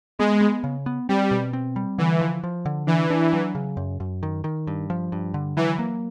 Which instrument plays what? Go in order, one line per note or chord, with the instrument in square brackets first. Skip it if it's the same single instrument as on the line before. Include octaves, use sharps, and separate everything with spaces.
[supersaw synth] G#3 [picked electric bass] B3
[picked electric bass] B3
C#3
B3
[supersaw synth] G3 [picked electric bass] C4
[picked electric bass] B2
C4
G3
[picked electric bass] D3 [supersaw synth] E3
[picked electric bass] F3
F3
D3
[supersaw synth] E3 [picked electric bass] D4
[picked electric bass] D4
F#3
C#3
F#2
F#2
D#3
D#3
G2
F3
G2
D3
[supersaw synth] E3 [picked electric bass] F#3
[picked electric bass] A#3